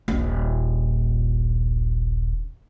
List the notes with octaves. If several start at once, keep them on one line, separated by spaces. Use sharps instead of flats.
D#1 A#1